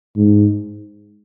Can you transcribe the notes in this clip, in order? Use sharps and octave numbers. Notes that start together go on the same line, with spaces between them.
G#2